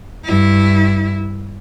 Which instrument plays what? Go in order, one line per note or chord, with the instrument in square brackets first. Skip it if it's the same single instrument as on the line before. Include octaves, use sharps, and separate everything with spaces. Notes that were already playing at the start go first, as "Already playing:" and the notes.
[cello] G2 E4